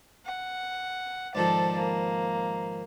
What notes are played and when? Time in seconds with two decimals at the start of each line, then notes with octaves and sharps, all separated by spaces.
0.26 F#5
1.35 G#2 D#3 F3 A4 D5
1.77 A#3